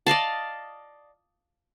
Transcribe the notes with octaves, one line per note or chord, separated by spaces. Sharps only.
D5 D#5 F5 A5